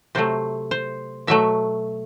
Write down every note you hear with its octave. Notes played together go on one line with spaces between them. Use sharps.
C3 F#3 A3 C5
C5
B2 F#3 A3 E5